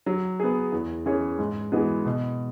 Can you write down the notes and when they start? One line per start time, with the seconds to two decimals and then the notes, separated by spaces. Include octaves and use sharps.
0.06 F#3
0.40 B3 G#4
0.72 E2
1.06 E3 C#4 G#4 C#5
1.39 G#2
1.72 E3 G#3 B3 F#4
2.05 B2